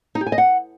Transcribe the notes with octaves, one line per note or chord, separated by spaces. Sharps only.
D#4
G4
G#5
D#5
F#5